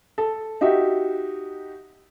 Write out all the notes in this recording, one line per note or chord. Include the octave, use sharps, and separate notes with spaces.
A4
D#4 F#4 G4 E5